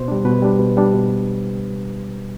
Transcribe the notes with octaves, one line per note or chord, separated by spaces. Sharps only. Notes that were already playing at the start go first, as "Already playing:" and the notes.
Already playing: B2 C5
G3 D4
B2 B4
G3 D4
B2
G3 D4
B2